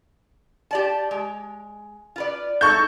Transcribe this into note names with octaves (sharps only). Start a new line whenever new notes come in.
G4 D5 A5
G#3
F4 B4 D5
D#4 A4 C#6 G6